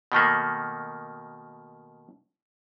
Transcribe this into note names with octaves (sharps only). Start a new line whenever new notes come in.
B2 D#3 A3 A#3